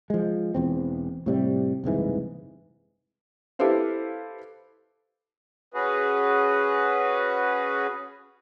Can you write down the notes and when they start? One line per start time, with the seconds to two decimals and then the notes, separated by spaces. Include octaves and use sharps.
0.10 F3 G#3
0.54 E1 E2 C4
1.26 A2 C3 G3
1.84 F#1 C2 G#2 E3
3.59 E4 G4 A4 B4 C5 F5
5.74 C#4 F#4 G#4 B4